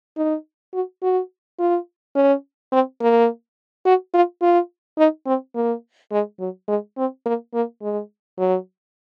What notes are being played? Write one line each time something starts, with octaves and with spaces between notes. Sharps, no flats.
D#4
F#4
F#4
F4
C#4
C4
A#3
F#4
F4
F4
D#4
C4
A#3
G#3
F#3
G#3
C4
A#3
A#3
G#3
F#3